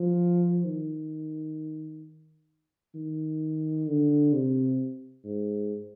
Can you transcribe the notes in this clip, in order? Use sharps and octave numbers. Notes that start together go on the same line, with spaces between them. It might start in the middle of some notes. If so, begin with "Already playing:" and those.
Already playing: F3
D#3
D#3
D3
C3
G#2